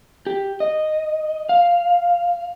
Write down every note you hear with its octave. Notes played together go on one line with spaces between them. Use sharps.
G4
D#5
F5